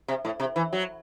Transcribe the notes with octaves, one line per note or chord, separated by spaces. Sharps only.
C3
A2
C3
E3
F#3